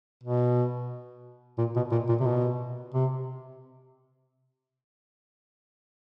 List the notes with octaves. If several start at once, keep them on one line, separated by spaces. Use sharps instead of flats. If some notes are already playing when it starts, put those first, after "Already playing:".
B2
A#2
B2
A#2
A#2
C3
B2
C3